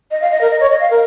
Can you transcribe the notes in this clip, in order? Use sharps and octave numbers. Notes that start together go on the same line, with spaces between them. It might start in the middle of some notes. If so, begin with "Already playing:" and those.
D#5
F5
D#5
A#4
D#5
C#5
D#5
F5
A#4